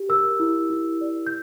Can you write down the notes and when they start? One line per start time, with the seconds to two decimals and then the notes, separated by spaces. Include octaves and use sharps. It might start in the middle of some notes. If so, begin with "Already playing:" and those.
Already playing: G4
0.09 A#4 E6
0.40 E4
0.70 E4
1.01 D5
1.27 G6